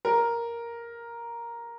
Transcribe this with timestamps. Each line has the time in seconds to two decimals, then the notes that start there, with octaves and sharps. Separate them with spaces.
0.05 A#4